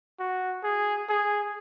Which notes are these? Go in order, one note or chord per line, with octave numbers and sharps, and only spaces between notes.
F#4
G#4
G#4